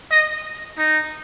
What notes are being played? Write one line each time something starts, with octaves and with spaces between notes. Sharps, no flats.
D#5
D#4